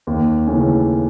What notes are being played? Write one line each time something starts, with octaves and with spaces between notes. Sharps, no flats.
D#2
C#3 E3 A3 C#4